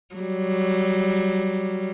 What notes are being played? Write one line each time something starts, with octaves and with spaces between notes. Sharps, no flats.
F#3 G3